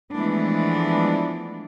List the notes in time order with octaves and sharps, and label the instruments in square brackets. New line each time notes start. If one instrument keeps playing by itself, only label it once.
[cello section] E3 F3 G#3 A3 B3 D4